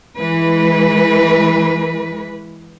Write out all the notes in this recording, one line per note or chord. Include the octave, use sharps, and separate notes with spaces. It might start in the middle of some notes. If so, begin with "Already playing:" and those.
E3 G#3 B4